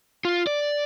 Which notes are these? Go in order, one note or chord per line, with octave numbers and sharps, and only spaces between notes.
F4
D5